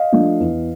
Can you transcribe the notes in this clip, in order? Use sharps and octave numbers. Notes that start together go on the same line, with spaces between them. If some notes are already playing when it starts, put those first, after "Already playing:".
Already playing: D#5 F5
F3 A3 D4
E2